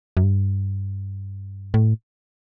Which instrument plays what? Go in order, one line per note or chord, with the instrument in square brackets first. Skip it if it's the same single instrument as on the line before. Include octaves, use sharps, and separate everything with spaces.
[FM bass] F#2
G2
A2